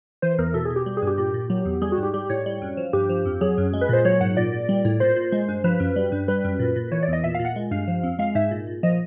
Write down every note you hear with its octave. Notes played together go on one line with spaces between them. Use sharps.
E3 C5
E2 A#4
B2 A4
B2 G#4
G4
G3 G4
G#4
G2
G4
A#2 G4
A#2
F#3
E2
G3 G#4
F#4
G#2
G4
G3 G4
A2 C#5
G3
F#2
F3
G2 G4
F3
F2
F#3 G#4
F#2
G#3
B4
A#2 C5
F#3 C#5
G#2 F#5
A#2 D5
A#2
G3
A2
A#2 C5
A#2
G#3
G2
F3 B4
F#2
G3
G2
G3 B4
F#2
A#2
A#2
E3 C#5
D5
E2
D#5
A#2 E5
A#2 F5
F#5
G#3
G2 F5
F3
F2
G#3 F5
G#2 E5
A#2
A#2
F3 D#5